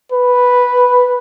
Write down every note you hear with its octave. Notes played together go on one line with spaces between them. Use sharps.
B4